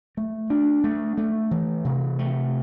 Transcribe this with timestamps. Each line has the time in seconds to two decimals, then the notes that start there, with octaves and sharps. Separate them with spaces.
0.17 A3
0.50 D4
0.84 A3
1.18 A3
1.51 E3
1.85 C3
2.19 A3